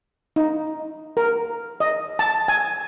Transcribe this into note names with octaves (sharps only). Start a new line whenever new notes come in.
D#4
A#4
D#5
A5
G#5